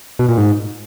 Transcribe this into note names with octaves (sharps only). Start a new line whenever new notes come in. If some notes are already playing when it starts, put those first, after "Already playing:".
B2
A#2
G#2